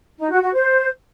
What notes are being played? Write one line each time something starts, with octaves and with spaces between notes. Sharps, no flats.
D#4
F#4
F#4
C5